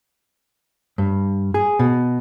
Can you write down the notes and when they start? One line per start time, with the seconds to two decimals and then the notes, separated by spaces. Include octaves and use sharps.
0.98 G2
1.54 G#4
1.79 B2